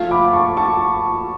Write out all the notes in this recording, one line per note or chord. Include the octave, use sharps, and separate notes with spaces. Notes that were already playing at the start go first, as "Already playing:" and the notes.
Already playing: F3 A3 F4
B5 D6
A5 C#6
A5 C#6